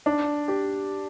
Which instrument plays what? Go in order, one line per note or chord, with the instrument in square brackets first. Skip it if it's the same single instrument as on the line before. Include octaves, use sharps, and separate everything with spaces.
[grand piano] D4
G4